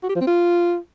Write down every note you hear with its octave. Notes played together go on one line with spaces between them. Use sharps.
F#4
G4
F3
C4
F4